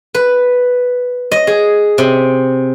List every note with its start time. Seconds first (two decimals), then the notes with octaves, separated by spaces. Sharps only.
0.14 B4
1.32 D#5
1.47 G#4
1.98 C3